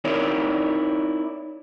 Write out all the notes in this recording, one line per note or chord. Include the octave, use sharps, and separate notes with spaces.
C4 D#4 E4 A#4 C#5 D5